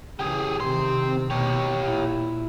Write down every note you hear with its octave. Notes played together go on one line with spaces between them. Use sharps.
C#3 E3 G4 G#4
C3 D#3 C4 C6
B2 G4 C#5
A#2 E4